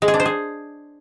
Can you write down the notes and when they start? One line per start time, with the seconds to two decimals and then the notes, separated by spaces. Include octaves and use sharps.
0.02 G#3
0.08 G#4
0.14 D4
0.20 C5
0.25 G#4